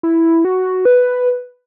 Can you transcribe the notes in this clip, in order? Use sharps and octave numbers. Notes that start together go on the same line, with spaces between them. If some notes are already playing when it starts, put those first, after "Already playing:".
E4
F#4
B4